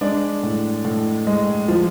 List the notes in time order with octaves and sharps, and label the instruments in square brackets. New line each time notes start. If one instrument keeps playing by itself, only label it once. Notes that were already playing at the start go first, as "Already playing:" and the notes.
[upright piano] G#3 D4 D5
A2
A2
G#3
F3